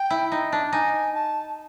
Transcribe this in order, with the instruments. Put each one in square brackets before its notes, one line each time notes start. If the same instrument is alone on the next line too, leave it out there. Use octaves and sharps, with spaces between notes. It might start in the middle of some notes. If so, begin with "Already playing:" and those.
Already playing: [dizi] G5
[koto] E4
D#4
D4
[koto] D#4 [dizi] G#5
[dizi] A5